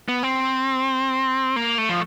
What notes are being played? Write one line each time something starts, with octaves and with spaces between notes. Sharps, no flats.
B3
C4
A#3
A3
F3